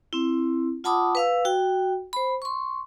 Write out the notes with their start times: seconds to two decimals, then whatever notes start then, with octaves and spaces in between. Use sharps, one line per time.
0.13 C4 E4
0.84 F4 F#5 A5 B5 D6 D#6
1.15 B4 F5 E6
1.45 F#4 G5
2.13 C5 B5
2.42 C6 C#6